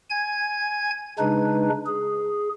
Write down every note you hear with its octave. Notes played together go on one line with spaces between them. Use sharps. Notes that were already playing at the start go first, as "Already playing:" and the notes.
G#5 G#6
C#3 G#3 D4 D#4 B4
G#4